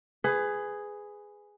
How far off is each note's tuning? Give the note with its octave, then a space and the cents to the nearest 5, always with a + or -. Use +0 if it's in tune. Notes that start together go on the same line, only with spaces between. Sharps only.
G#4 +0 B4 +25